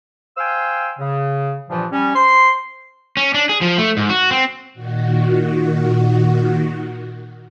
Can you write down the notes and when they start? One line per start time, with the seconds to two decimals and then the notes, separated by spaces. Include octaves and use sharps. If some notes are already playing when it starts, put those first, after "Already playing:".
0.38 C5 F5 G5 G#5 E6
0.99 C#3
1.69 G2 A#2 E3 F3
1.92 G3 C#4
2.15 C5 C6
3.17 C#4
3.34 D4
3.49 G#4
3.61 F3
3.78 A3
3.97 G#2
4.10 F#4
4.31 C4
4.74 A#2 D#3 F#4